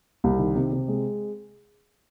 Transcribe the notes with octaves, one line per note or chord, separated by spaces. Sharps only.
C2
D#3
C3
C3
G#3